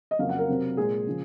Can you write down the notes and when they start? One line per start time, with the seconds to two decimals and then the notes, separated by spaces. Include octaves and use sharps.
0.11 D#5
0.19 F2 C#3 F#3 A#3 F5
0.29 F#5
0.38 A#4
0.48 C3 F#3 C4
0.77 A#2 G#3 C4 G#4
1.07 C#3 F3